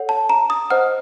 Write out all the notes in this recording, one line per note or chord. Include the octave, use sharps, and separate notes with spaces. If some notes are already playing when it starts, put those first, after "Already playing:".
Already playing: A4 C#5 F#5
A5
A#5
D#6
C5 D#5 F#5 F6